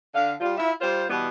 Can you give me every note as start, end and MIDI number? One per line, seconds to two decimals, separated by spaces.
0.14 0.33 50
0.14 0.33 77
0.41 0.54 55
0.41 0.54 65
0.57 0.72 64
0.57 0.72 65
0.57 0.72 76
0.80 1.04 55
0.80 1.04 65
0.80 1.04 72
1.08 1.29 47
1.08 1.29 52
1.08 1.29 55
1.08 1.29 59